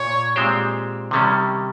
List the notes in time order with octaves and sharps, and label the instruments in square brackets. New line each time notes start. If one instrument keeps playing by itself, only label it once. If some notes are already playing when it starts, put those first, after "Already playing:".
Already playing: [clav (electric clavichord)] A#2 [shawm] C#5
[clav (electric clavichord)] A#2 G#3 C4 G4 C5
C3 D#3 G3 C#4